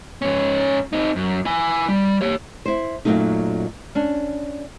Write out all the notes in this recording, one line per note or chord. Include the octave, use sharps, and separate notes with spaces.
G#2 C#4
C4 D#4
F#2
E4 G#5
G3
G4 C#5
E4 C5
F#2 A#2 D#3 F#3 A3 D#4
C#4 D4